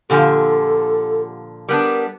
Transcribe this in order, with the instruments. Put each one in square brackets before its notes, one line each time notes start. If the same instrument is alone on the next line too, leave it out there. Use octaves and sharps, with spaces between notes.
[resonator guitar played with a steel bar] A#2 D3 F3 [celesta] G4 F#5 G#5 [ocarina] A4
[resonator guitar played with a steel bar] G3 B3 D4 [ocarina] A#4